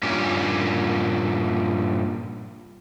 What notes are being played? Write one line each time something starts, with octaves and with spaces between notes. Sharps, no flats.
G2 A#2 C#4 G4